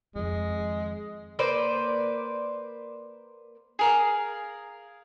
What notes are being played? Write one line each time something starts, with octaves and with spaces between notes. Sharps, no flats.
F2 D#3 G#3
A#3 B4 C5 D5
G#4 A#4 F5